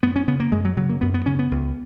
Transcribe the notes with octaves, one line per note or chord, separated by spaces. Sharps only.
F#2 B3
C#4
C#3 B3
A#3
F#2 G#3
F#3
C#3 F#3
A#3
F#2 B3
B3
C#3 C#4
B3
C#2